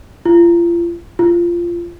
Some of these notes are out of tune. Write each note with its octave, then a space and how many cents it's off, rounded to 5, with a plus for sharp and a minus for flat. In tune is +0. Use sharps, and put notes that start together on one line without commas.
F4 -35
F4 -15